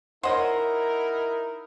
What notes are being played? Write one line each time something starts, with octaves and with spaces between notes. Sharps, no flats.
D#4 E4 A#4 C5 C#5 D#5 F#5